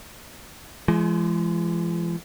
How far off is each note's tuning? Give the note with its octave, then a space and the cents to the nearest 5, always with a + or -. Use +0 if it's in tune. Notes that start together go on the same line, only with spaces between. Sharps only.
F3 -45 G#3 +20